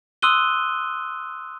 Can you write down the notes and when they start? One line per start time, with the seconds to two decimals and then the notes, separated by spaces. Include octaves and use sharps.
0.22 C6 D#6 E6 F#6 D#7 G7